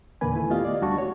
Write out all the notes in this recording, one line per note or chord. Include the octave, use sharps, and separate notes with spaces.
E2 A#2 D3 A#3 B4 G#5
D#3 A3 E4
A3 B3 F4 G4 D#5 F5
D5
D2 G3 D4 F#4 A5 C#6
C#5